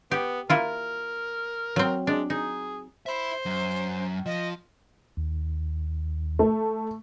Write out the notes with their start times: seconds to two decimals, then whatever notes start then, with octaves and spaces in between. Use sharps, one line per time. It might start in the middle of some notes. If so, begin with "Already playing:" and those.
0.11 B3 G4
0.50 A#3 E4 F4 A#4
1.76 F#3 C4
2.07 G#3 D4
2.30 D#4 G#4
3.06 C5 E5 B5
3.46 F#2
4.26 F3 D#5
5.17 D#2
6.39 A3